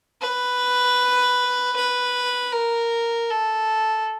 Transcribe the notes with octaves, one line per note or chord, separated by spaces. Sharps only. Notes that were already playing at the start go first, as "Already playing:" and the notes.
B4
B4
A#4
A4